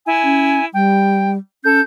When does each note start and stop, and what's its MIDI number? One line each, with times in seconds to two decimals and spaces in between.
0.06 0.65 64
0.06 0.65 80
0.24 0.59 61
0.74 1.38 55
0.74 1.30 79
1.64 1.81 61
1.64 1.81 69
1.64 1.81 91